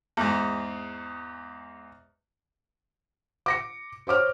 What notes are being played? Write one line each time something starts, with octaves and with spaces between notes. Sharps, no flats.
E2 G#2
D6 A#6 C#7
C5 C#5 D6 F6